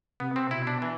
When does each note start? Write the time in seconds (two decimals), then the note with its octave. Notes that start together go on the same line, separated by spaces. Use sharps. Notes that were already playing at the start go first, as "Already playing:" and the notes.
0.20 C3 B3
0.36 C4
0.51 B2 E4
0.67 D4
0.82 E3